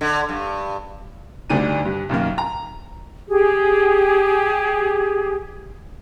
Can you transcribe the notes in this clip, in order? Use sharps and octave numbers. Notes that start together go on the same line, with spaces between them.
D3
G2
D2 G2 D3 D4 D#4 D#7
G2
B1 F#2 D#3 A#3
A#5
G4 G#4